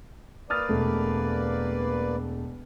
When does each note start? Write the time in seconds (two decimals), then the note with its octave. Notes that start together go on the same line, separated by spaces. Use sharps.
0.50 A#3 B4 D5 D#6 F6 A6
0.69 E1 A3